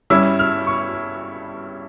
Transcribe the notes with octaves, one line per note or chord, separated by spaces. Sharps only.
G2 G3 C#4 E4 E6
F6
C#6